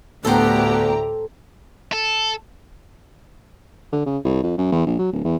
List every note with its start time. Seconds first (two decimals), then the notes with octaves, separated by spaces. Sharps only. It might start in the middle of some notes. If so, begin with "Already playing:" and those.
0.25 D2 A2 B3 G4 A4 C5 A#5
1.93 A4
3.92 D3
4.06 C#3
4.25 C2
4.43 F2
4.58 F#2
4.72 E2
4.87 A#1
4.99 F#3
5.12 D1
5.25 E2